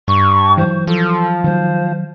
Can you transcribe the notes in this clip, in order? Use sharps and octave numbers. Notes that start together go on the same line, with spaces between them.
G2 C#6
E3 F#3 C5
F3 A4
D#3 F#3 C5